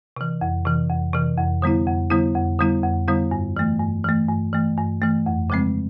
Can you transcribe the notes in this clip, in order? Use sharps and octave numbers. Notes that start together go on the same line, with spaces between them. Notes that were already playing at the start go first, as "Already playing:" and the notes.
C3 E3
F2
C3 E3
F2
C3 E3
F2
D3 G3 B3 E4
F2
D3 G3 B3 E4
F2
D3 G3 B3 E4
F2
D3 G3 B3 E4
G2
E3 A3
G2
E3 A3
G2
E3 A3
G2
E3 A3
F2
C#3 F3 G#3 C4